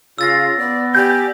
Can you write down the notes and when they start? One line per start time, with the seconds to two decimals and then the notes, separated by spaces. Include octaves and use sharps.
0.18 C#3 F4 E6 A6 A#6
0.58 B3 D5
0.95 G4 D5 G#5 G6